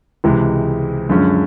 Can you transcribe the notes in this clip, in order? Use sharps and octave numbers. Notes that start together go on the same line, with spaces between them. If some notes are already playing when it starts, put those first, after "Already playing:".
C#2 C3 E3 G#3
F#2 D3 F3 G#3 C#4